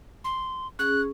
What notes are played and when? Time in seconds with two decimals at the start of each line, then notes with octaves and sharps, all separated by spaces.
0.24 C6
0.79 C#4 G#4 F#6